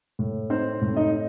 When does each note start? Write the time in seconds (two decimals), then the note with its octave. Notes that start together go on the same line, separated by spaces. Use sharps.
0.19 A2
0.50 C4 D#4 C5
0.82 A2
0.97 D#4 D#5
1.12 D#4